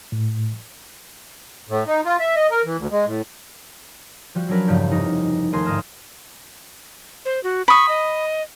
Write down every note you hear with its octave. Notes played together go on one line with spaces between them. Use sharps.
A2
A2
D#4
F4
E5
D#5
A#4
E3
D2
G#3
A2
F3 G3 F#4
F#3 C#4 D4 A#4 B4
E2 G2 C#3 F3 G3
F1 D#4
D#2 A3 G#4 A#4 C6
G1 G#2 D#4 D#6 F6 E7
C5
F#4
B5 C#6 D#6
D#5